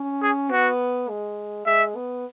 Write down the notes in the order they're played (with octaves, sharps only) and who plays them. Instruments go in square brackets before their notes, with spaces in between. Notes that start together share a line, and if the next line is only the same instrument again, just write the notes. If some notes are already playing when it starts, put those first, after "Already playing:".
Already playing: [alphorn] C#4
[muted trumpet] G#4
[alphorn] B3 [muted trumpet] F#4
[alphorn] G#3
[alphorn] G#3 [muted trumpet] E5
[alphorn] B3